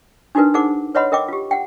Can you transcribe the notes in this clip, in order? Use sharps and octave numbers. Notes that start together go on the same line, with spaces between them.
D4 D#4 F#4 A#4 B4
D#4 G#4 A#4 C5 F#5 D6
B4 C#5 D#5 F#5 B5 C6
A#4 D#5 G5 D6
F4 G4
F#5 G5